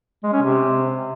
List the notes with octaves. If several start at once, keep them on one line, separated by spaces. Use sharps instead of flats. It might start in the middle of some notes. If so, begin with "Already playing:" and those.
G#3
C#4
C3